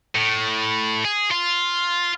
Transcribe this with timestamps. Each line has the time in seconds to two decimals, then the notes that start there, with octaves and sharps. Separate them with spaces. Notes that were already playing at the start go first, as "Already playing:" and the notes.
0.15 A2
1.05 G#4
1.31 F4